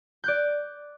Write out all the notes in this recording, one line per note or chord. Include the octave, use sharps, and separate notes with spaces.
D5 F#6 G6